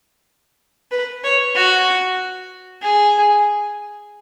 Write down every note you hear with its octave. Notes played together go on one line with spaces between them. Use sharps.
B4
C#5
F#4
G#4